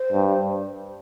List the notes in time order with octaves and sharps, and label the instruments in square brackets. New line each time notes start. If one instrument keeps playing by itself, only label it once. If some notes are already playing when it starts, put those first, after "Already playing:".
Already playing: [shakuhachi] C5
[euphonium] G2